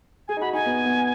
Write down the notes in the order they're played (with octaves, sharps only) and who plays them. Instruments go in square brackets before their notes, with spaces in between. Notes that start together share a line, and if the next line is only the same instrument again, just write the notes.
[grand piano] G#4 [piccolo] G#5
[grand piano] D#4
[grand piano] F#4 [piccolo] B5
[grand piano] D#4 [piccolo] G#5
[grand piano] B3
B3